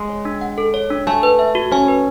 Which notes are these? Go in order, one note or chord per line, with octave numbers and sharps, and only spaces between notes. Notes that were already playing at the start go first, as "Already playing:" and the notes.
Already playing: G#3
C#5
D4
F#5
A4
C#5
D4
A3 G#5
B4
E5
F#4
C#4 G#5
B4